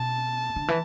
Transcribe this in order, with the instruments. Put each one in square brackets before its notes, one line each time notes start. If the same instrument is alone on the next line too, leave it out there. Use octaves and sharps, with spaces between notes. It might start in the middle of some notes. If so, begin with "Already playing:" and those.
Already playing: [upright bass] B2 [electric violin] A5
[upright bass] D3
E3